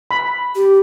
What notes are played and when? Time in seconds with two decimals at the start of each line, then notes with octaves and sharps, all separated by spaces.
0.11 B5
0.55 G4